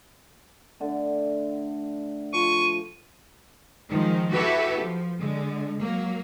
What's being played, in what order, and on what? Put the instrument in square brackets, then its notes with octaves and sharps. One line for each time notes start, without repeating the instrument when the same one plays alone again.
[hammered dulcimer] D3 A3
[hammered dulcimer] F3 [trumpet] C#6 [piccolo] D#7
[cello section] D#3 F3 G#3
E4 F#4 G4 A4 B4
F3
D3 G#3
F#3 A#3